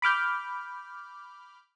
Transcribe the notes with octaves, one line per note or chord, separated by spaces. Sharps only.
B5 D6 F6 G6